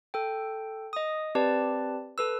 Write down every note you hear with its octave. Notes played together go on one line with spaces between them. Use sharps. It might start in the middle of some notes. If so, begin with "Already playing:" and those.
A4 G5
D#5 D#6
C4 G4 B4 D5 A5
A4 B4 E6